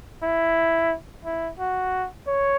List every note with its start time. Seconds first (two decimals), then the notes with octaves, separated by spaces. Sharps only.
0.23 E4
1.25 E4
1.59 F#4
2.27 C#5